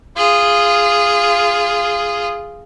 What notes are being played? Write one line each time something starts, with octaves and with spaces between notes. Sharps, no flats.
F4 G#4